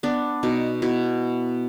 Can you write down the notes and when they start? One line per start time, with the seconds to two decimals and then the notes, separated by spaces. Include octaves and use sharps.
0.03 B3 D4
0.43 B2 D#4
0.82 B2 E4